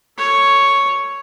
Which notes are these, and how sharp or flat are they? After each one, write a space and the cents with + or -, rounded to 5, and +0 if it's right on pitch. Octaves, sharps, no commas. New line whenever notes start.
A4 +25 C#5 +0